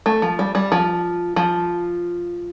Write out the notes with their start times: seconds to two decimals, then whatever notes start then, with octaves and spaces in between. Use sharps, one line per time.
0.06 A3
0.22 F3
0.39 G3
0.55 G3
0.72 F3
1.36 F3